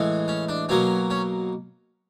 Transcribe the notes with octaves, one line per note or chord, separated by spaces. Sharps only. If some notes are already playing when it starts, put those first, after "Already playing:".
Already playing: A2 E3 G#3
C#4
D4
B2 F#3 A#3 C#4
C#4